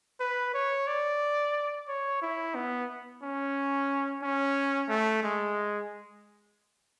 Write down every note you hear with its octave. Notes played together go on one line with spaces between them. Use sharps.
B4
C#5
D5
C#5
E4
B3
C#4
C#4
A3
G#3